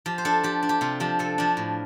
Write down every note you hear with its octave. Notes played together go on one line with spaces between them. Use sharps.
F3 G4
C5
D4 A4
F3 G4
D4
G4
C3 F4
F3 D4 G4
C3 A4
F3 D4
A2